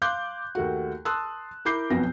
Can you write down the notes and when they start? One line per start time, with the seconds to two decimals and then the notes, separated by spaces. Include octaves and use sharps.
0.02 F5 C6 D6 F#6 G6
0.55 D#2 A3 F#4
1.05 A5 C6 D#6 E6 F#6
1.65 E4 A#4 B5 D6 G6 C7
1.90 B1 F2 B2 B3 A#6